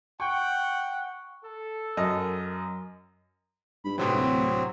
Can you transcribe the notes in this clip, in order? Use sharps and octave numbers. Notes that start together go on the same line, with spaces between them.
F#5 G5 C#6
A4
F#2 A#4 D#5
G2 B5
A2 C3 E3 F#3 C4
D1